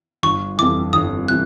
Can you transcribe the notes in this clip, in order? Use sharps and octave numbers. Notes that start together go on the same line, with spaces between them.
G1 C#6
F2 C3 E3 D6
G1 D#6
C3 E3 F#6